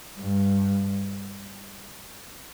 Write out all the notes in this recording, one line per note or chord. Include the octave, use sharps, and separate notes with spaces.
G2